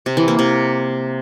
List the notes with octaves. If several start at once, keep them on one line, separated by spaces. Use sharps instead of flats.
C3
E3
A#3
C3